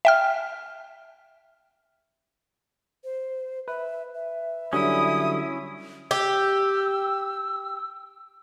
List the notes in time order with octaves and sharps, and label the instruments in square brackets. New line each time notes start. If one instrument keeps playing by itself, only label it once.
[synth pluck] E5 G5 F6
[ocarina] C5
[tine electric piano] B4 [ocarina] E5
[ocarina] E5
[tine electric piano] D3 F#3 G3 [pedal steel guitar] C#4 E4 [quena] D#6
[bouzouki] G4 [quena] E6